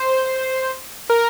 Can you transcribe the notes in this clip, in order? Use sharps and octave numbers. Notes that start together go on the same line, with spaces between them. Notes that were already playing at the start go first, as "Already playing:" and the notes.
Already playing: C5
A#4